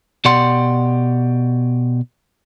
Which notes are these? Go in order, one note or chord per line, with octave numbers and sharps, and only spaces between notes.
B2 G4 D5 F#5 C6